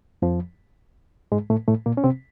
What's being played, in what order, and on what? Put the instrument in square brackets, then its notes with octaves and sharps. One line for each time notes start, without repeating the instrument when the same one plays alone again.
[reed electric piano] F2 F3
G#2 G#3
A2 A3
A2 A3
A#2 A#3
C#4
C3 C4